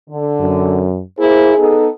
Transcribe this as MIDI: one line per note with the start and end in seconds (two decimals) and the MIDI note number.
0.10 0.86 50
0.40 1.02 42
1.19 1.53 58
1.19 1.53 64
1.19 1.77 68
1.19 1.53 72
1.58 1.87 59
1.58 1.87 63
1.58 1.87 69